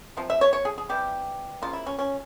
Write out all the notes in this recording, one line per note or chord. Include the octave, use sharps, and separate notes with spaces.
C3 F3
E5
C#5
C#5
G#4
G#4
C3 E3 G3 G4
C#3 F3 A#3 F4
E4
C#4
C#4